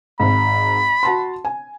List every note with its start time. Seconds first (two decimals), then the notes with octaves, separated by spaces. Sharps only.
0.20 G#1 G#2 B5
1.03 F#4 A5 C6
1.45 G#5